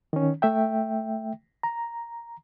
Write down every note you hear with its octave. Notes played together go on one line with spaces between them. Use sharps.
D#3 C#4
A3 E5 G5
A#5